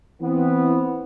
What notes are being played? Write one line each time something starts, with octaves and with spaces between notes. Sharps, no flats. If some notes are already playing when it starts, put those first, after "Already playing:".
E3 B3 C4